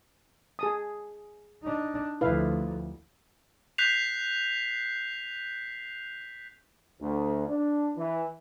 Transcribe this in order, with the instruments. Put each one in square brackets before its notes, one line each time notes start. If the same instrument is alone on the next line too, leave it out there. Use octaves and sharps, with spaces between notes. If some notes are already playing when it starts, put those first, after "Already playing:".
[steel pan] G#4 A5 D#6
[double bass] D4 D#4
[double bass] D2 F3 [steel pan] E4 B4 F5
[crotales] F#6 G6 B6 C7 F7
[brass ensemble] D2
D4
E3